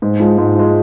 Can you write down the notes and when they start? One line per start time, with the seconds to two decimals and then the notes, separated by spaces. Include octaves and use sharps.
0.02 G#2
0.20 F3 G#3
0.38 G#2
0.55 F3 G#3